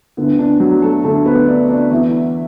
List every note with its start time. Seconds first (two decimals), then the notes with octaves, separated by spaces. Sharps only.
0.17 D2 D3 B3
0.39 D3 D4
0.60 F#3 F#4
0.82 A3 A4
1.03 D2 D3 A3 A4
1.26 B3 B4
1.48 D4 D5
1.69 D4 D5
1.91 E2 E3 E4 E5